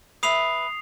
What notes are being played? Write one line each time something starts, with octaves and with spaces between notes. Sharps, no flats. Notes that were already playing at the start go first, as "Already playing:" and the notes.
B4 E5 D#6 C7 F7